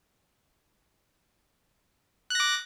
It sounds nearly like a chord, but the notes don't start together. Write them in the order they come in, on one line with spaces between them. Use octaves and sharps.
F#6 A#6 D6